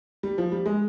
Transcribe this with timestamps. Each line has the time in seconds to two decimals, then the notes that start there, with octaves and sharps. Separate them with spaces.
0.23 G3
0.38 F3
0.52 G3
0.66 G#3